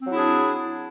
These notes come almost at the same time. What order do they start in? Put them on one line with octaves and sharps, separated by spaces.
C4 F#3 E4 G#4 D4